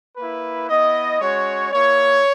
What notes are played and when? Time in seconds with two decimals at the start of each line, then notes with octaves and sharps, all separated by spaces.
0.17 A#3 E4 B4
0.69 B3 E4 D#5
1.21 G#3 C#4 F#4 C#5
1.72 A#3 E4 C#5